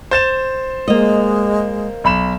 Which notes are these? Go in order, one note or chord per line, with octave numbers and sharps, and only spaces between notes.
C5 A6 E7
G#3 A#3 D#5
B1 B5 E7